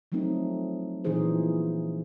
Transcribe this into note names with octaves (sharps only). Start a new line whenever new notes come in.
F3 F#3 A3 C4 D#4
A#2 E3 F3 D#4 G#4 C5